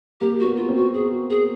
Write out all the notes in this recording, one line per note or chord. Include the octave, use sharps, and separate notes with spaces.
A#3 G4
B3 F#4
F4
C4
F#4
G#4
G#4